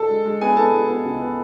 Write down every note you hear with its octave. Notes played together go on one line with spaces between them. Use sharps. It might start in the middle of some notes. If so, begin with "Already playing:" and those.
Already playing: A4 A5
G#3
G#3
B3 G#4 G#5
B3 A4 A5
G#3
B3
C#2
B3